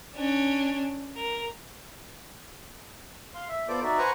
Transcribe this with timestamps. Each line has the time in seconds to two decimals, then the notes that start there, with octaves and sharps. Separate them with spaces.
0.16 C#4 D4
1.16 A#4
3.35 F5 C6
3.49 E5
3.68 B3 F4 A4 C5 D5 D6
3.83 D#4 F#4 D5 E5
3.98 B4 C5 F#5 G#5 A#5 C#6